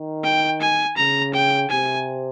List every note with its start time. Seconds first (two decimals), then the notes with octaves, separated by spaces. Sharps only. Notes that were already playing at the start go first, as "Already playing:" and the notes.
Already playing: D#3
0.24 G5
0.61 G#5
0.97 C#3 A#5
1.34 G5
1.71 C3 G#5